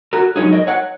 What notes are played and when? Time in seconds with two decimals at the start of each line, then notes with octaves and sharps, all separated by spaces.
0.13 F#4 A#4
0.36 G#2 F#3 D#4 G#4 C#5
0.52 A#4 D#5
0.67 C#5 F#5